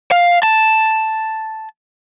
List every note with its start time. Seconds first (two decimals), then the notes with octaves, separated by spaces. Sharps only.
0.11 F5
0.43 A5